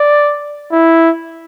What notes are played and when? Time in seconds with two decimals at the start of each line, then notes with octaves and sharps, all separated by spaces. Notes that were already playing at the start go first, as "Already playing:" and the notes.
Already playing: D5
0.72 E4